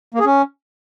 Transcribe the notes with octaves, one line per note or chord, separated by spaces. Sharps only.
A#3
G#4
C#4